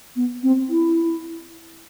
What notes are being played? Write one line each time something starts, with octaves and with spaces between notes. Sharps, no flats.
B3
C4
E4